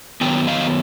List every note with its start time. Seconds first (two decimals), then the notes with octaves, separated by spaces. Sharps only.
0.21 D#3 F#3 B3 G5
0.47 D#5 F5